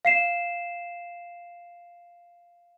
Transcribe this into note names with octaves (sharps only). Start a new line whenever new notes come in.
F5 C7 E7